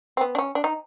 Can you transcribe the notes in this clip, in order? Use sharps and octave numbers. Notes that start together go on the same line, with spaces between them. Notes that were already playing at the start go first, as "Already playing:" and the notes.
C4
B3
D4
C#4
D4
D#4